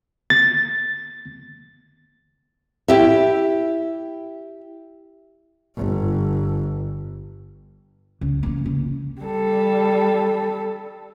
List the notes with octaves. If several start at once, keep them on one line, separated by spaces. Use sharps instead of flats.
A6
E4 G4 E5
G1
C#2
E3 A#3
C#2
G3 A4